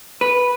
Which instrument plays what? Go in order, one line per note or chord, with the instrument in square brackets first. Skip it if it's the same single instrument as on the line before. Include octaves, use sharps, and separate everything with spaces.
[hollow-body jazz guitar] B4